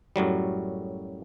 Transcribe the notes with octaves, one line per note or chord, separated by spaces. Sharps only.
F#2 A2 F#3 G3